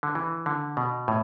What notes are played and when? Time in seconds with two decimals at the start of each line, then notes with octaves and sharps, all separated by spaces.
0.03 D3
0.15 E3
0.46 D3
0.77 B2
1.08 A2